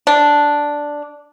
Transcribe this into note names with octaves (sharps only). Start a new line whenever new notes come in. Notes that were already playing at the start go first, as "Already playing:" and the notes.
D4